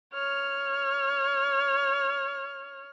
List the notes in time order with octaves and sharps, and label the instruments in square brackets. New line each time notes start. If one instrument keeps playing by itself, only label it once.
[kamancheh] C#5 F6